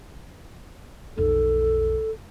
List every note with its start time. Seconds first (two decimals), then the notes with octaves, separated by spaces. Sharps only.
1.17 B1 F2 A4